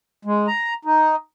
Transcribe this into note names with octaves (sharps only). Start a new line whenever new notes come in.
G#3
A#5
D#4